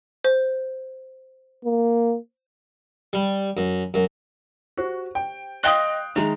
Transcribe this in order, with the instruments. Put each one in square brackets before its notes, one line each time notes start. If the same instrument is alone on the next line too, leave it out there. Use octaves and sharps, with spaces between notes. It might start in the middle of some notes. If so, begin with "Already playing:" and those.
[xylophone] C5
[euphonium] A#3
[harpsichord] G3
F#2
F#2
[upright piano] F#4 [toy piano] G4 C5
[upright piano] G5
[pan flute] D#5 [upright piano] F5 G5 F#6 [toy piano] C6 D#6
[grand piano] D#3 G#3 [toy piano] E5 [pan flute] A#5